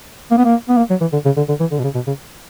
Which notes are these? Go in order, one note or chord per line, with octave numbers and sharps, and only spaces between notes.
A#3
B3
A#3
B3
A#3
F#3
E3
D3
C#3
D3
D3
E3
D3
B2
C#3
B2
C#3